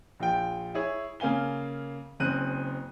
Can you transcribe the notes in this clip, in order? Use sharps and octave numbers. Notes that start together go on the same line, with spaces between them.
A#1 F4 G5
E4 G#4 C#5
C#3 A#3 F5 G#5 G7
F#1 C#3 C4 F#6 D#7